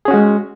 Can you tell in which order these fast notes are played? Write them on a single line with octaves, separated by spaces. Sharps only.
G#4 C#4 F#4 G#3